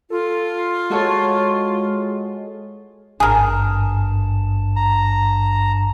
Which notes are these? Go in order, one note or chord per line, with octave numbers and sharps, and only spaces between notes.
F4 A4
G#3 F#4 A4 C#5
G#1 G2 G#4 A#4 A5
A#5